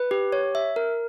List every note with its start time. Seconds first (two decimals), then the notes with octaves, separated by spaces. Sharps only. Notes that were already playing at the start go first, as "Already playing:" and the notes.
Already playing: B4
0.11 G4
0.32 C#5
0.55 E5
0.76 A#4